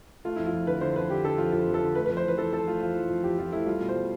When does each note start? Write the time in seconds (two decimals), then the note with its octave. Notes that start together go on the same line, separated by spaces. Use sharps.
0.25 A3 F4
0.36 F2 E4
0.45 F4
0.53 F2
0.67 D3 B4
0.81 D3 C5
0.96 F2 B4
1.10 D3 G4
1.24 D3 A4
1.38 F2 F4
1.52 F2 F4
1.67 F2
1.74 A4
1.82 D3
1.95 A3 B4
2.06 F2 B4
2.17 C5
2.24 E3 B4
2.38 E3 A4
2.52 F2 A4
2.67 A3 F4
2.81 F2 F4
2.95 E3
3.09 F2
3.24 F2 G4
3.38 F2 F4
3.52 A3 E4
3.67 G3 F4
3.81 B2
3.89 C5
3.95 G3